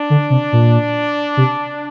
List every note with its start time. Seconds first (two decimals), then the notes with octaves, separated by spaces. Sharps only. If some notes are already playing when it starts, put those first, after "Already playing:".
Already playing: D4
0.10 D3
0.30 C3
0.52 A#2
1.37 C3